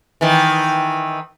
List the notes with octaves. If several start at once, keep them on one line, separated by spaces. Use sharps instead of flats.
D#3 E3